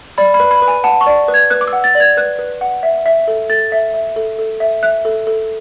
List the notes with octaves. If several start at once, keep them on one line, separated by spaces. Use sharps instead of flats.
D5 B5
B5
B4
B5
B4
G#5
F#5 A5
C#6
D5
B4
G#6
B4 F#6
D6
E6
F#5
A6
D5
G#6
B4 F#6
B4
F#5
E5
E5
A4
A4 A6
E5
E5
A4
A4
E5
E5 F#6
A4
A4